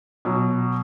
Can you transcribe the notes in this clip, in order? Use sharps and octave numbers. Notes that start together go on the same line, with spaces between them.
B2 F#3